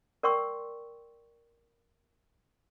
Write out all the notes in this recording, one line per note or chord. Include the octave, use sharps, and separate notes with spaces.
A#4 D5 G5 C6 C#6 E6